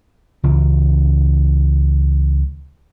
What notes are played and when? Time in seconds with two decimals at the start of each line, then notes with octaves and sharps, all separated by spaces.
0.43 C#2 C#3 E3